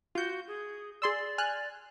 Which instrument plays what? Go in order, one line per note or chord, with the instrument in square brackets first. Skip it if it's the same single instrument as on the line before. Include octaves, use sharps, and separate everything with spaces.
[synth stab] F4 G6 [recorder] F#4
[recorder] G#4
[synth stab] G#4 C6 E6 [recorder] D5
[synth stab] G#5 F6 F#6